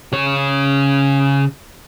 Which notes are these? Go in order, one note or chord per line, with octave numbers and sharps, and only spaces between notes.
C#3 C#5